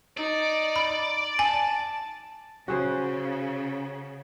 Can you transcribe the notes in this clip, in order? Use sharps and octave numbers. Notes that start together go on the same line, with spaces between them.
D#4 D5
B5
G#5 A5
C#3 F#4 G#4 C5